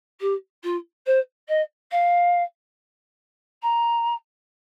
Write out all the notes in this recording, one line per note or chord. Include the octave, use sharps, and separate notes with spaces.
G4
F4
C5
D#5
F5
A#5